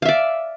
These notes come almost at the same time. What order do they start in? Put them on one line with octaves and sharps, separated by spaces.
F5 E5 D5